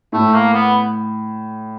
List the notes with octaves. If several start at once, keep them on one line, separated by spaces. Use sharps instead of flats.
A2 A3
A#3
B3